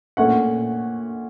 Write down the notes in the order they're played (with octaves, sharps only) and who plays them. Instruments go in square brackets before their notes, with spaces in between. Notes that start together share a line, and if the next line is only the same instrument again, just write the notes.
[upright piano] A#2 A3 C#4 F#5